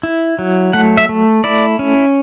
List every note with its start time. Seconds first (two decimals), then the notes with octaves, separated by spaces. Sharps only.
0.03 E4
0.39 F#3
0.73 A3 F#5
0.97 E5
1.09 A3
1.44 E4 D5
1.79 C#4